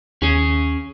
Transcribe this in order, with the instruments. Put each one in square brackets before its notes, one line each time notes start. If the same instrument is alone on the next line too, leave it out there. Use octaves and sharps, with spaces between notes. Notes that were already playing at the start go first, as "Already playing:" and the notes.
[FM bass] D#2 [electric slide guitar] C#4 G#4